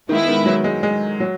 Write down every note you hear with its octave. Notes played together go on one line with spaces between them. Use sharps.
D#3 G#3 B3 E4
D#3
F#3
G#3
G#3
F#3